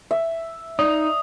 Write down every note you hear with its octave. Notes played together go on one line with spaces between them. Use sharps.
E5
D#4 D5 D#6